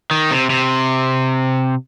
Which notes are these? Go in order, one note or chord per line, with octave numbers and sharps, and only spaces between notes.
D#3
C3
C3